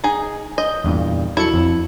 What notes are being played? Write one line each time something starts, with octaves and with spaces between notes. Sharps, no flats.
D#4 G#4
D#5 G6
E2 G2 A#2
F#3 E4 A4 C#7
F2